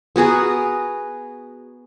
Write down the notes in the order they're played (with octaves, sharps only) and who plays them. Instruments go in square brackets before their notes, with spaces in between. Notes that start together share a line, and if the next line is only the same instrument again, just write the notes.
[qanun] B3 F#4 G#4 A#4